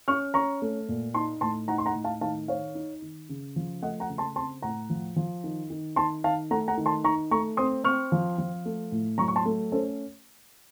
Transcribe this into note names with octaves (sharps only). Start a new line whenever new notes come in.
C#4 C#6 F6
C#4 A#5 C#6
A3
A#2
D#4 A5 C6
A2 A5 C6
D#4 F#5 A#5
C6
F#5 A#5
A2
F5 A5
D#3 F5 A5
D#3 C#5 F5
D#4
D#3
C#3
F3
A3 D#5 F#5
F#5 A#5
C#3
A5 C6
C4 A5 C6
A2 F#5 A#5
F3
F3
D#3
D#3
D#3 A5 C6
D#3 F5 A5
A3 F#5 A#5
F#5 A#5
D#3
A5 C6
D#4 A#5 C#6
A3 A#5 C#6
C4 C6 D#6
C4 C#6 F6
F3
F3
A3
A2
F#3 A#5 C#6
C#6
A5 C6
A3
C#4 A4 C5